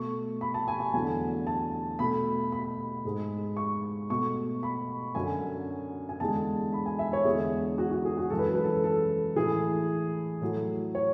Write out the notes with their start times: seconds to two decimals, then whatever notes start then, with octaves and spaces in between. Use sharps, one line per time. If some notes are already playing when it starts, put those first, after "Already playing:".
Already playing: B2 A3 C#6
0.41 B5
0.54 A5
0.68 G#5
0.80 G#5
0.93 E2 D3 F#3 A3 G#5
1.47 A5
1.99 B2 A3 B5
2.52 B5
3.05 G#2 G#3
3.57 C#6
4.10 B2 A3 C#6
4.63 B5
5.15 F#2 D3 F#3 G#5
6.09 G#5
6.20 E2 D3 G#3 A5
6.73 B5
6.86 G#5
6.99 E5
7.13 C#5
7.25 E2 D3 G#3 G#4
7.78 F#4
7.91 F#4
8.05 G#4
8.18 F#4
8.30 F#2 E3 G#3 A4
8.39 B4
8.48 A4
8.55 B4
8.64 A4
8.84 A4
9.36 A2 E3 A3 G#4
10.41 A2 F#3 A3
10.95 C#5